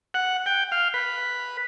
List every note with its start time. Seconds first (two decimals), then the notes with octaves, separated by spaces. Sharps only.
0.14 F#5
0.46 G5
0.72 F5
0.94 B4